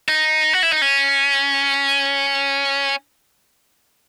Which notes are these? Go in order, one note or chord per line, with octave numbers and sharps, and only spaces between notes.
D#4
F#4
E4
D#4
C#4